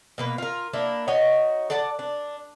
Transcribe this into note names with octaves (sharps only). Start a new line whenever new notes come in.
B2 A#3 B4
F4 A#4
A#3 D4 E4
D#4 F#4 C#5 D#5
A4 D5 F#5 A5
D4